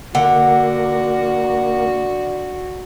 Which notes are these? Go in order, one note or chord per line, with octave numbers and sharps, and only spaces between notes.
D3 A#3 F#4 F#5